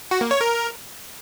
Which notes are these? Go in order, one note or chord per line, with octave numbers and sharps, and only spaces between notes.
F#4
A#3
C#5
A#4